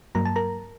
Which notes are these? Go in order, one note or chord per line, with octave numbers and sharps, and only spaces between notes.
G2 F#3 A#3 A#5
A5
A#4 A#5